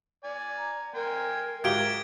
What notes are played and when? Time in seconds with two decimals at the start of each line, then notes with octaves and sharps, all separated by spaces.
0.24 D5 G#5
0.58 A#5
0.95 A#4 G5 G#5 C6
1.64 G#2 F#3 F4 G4 E5 G#6 D7 G7